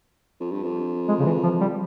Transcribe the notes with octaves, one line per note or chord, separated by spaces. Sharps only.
F2
G2
F2
G#3
C#3
E3
F3
G3